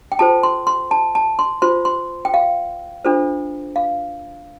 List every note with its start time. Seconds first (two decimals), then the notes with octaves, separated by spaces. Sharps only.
0.12 G5
0.19 F4 A4 C5 A5
0.43 C6
0.67 C6
0.91 A5
1.15 A5
1.39 C6
1.62 F4 C5 C6
1.85 C6
2.25 G5
2.34 F5
3.05 D4 F4 A4 C5
3.76 F5